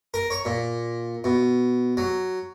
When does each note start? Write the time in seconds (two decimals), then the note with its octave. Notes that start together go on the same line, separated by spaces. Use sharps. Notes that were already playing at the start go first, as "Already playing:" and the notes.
0.14 A#4
0.30 C#5
0.45 A#2
1.24 B2
1.97 F#3